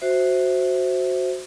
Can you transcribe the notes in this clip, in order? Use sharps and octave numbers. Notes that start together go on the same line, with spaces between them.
F#4 C5 E5